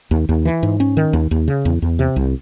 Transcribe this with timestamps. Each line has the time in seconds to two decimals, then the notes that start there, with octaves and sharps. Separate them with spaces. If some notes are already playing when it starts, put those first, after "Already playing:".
0.11 D#2
0.29 D#2
0.45 E3
0.63 G#2
0.80 C#4
0.97 D#3
1.13 D#2
1.31 D#2
1.48 C#3
1.65 E2
1.82 E2
1.99 C3
2.16 C2